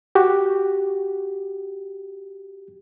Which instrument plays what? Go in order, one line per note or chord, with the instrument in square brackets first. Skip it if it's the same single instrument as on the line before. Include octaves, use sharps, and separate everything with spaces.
[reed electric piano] F#4 G4